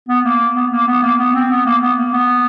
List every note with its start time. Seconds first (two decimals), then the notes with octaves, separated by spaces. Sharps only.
0.08 B3
0.25 A#3
0.56 B3
0.71 A#3
0.87 B3
1.03 A#3
1.19 B3
1.35 C4
1.50 B3
1.66 A#3
1.81 B3
1.97 A#3
2.13 B3